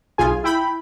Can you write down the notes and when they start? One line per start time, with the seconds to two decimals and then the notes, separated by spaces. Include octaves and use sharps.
0.18 B1 F4 G#4 G#5
0.44 E4 G5 B5